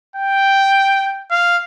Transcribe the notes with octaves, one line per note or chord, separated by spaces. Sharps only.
G5
F5